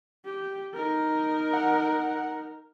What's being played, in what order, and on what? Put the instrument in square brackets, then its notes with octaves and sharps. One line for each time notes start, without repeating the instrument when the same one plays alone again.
[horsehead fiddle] G4
D#4 A#4
[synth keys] F#5